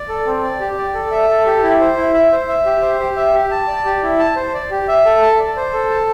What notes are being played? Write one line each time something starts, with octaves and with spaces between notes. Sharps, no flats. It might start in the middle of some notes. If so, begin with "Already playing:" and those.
Already playing: D5
A4
C4
D5
G4
D5
A4
E5
A4
G4
E4
C5
E4
E5
C5
E5
G4
C5
G4
E5
G4
A5
D5
G4
E4
A5
C5
D5
G4
E5
A4
A5
D5
C5
A4
A5